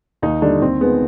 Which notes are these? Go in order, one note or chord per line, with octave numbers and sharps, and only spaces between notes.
D#2 D#4
D3 G3 D4
D#2 C4
D#3 G#3 B3